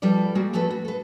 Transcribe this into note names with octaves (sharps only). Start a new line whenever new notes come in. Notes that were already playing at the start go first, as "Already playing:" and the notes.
F3 G3 A4 B4 D5
G3 G#3 A#3 F#4
F3 A3 C4 C#4 A4 B4
F#4
A4 B4